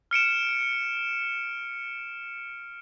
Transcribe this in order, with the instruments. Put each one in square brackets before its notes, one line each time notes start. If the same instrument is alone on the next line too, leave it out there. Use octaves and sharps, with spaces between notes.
[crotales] F6 C#7 D7 E7